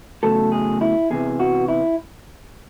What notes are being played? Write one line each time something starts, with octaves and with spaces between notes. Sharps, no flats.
E2 C#3 F#3 A3 A4
G#4
E4
E2 C3 E3 G#4
F#4
E4